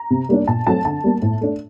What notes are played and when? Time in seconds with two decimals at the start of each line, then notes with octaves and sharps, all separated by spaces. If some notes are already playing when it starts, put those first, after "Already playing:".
Already playing: A#5
0.10 C3
0.29 G3 A#3 D4
0.47 A#2 A5
0.67 F#3 A3 C4 A5
0.85 D3 A5
1.04 G3 A#3
1.22 A2
1.41 A3 D4